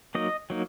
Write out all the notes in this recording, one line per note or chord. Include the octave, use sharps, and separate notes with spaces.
F#3 A#3 D#4 D#5
F#3 A#3 D#4